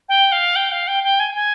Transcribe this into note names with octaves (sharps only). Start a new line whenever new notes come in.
G5
F5
G5
F5
G5
G5
G#5
G#5